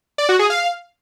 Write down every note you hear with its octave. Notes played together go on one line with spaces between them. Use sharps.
D5
F#4
G#4
F5